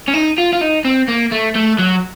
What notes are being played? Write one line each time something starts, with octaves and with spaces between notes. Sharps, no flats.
C#4
D#4
F4
F4
D#4
C4
A#3
A3
A3
F#3